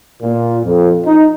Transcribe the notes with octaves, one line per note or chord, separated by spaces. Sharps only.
A#2
F2
D#4